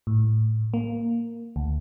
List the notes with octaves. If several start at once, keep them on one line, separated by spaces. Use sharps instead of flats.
A2
A#3
D2